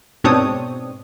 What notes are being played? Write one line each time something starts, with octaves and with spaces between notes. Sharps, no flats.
G#2 B2 C4 D4 C#5 D#6